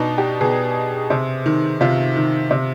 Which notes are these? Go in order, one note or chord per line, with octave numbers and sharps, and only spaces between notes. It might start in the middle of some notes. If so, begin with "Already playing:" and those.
Already playing: B2 D4 D#4
G4
B2 G#4
C3
D#3
C3 F4
D#3
C3